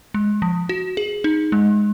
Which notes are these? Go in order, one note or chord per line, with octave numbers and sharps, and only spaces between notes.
G#3
F3
F#4
G#4
D#4
G#3